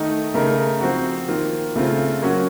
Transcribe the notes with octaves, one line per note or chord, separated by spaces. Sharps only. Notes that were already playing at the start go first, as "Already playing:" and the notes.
Already playing: D#3 A3 D#4
C#3 A3 D#4 A#4
F3 C4 F#4
D#3 A#3 F4
C#3 A3 C4 F4
F#3 A#3 C#4 F#4